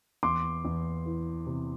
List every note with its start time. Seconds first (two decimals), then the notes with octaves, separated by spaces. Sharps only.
0.23 E2 C6 D6
0.65 E2
1.06 E3
1.47 C3